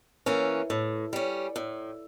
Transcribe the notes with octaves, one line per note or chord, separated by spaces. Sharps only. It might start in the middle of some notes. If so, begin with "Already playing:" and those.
E3 A#3 C#4
A2
G3 C#4
A2